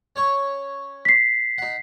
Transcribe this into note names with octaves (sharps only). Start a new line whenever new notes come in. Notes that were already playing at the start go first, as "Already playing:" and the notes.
C#4 C#5 C#6
B6 C7
D#4 F#5